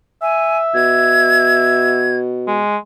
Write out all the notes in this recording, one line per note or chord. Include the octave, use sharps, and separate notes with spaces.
E5 G#5
B2 G#6
G#3